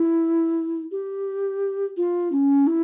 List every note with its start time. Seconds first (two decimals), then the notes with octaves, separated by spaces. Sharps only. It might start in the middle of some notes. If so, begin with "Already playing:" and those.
Already playing: E4
0.92 G4
1.97 F4
2.32 C#4
2.67 E4